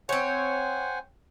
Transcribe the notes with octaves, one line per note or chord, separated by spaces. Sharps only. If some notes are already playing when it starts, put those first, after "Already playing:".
C4 C5 C#5 F#5 G#5